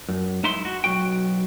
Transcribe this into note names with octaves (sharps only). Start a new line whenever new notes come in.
F#2
G#3 D#4 E4 E5 C6
F#4
B1 F#2 F#3 F#4 G5